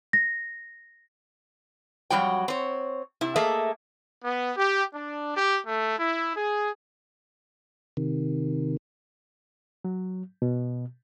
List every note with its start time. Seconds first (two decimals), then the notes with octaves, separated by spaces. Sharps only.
0.13 A#6
2.10 F2 F#3 G3 F#4 G5
2.48 C4 C#5
3.21 C3 E4
3.36 A3 A#3 G#4 D#5 E5
4.24 B3
4.57 G4
4.94 D4
5.37 G4
5.66 A3
5.99 E4
6.37 G#4
7.97 C3 D#3
9.85 F#3
10.42 B2